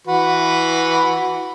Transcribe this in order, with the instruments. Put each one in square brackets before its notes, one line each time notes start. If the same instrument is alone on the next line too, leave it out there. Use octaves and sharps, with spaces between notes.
[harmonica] E3 F#4 B4